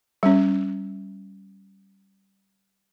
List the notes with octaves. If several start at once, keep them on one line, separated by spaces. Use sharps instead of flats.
G3 C#4